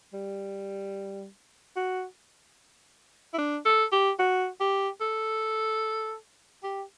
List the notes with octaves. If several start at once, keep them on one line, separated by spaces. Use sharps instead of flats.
G3
F#4
E4
D4
A4
G4
F#4
G4
A4
G4